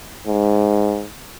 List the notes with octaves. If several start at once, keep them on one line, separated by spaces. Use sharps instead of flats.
G#2